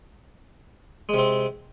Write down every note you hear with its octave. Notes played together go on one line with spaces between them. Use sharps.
C3 G#3 C4